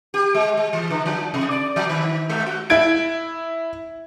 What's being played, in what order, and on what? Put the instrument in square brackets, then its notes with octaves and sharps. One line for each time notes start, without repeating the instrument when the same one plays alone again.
[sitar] G4
G#3
G#3
E3
D3
F3
C3
D5
F3
D#3
G#3
F#4
[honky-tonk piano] E4 G#6 D7